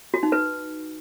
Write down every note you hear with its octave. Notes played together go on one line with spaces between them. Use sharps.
F#4
D#4
B4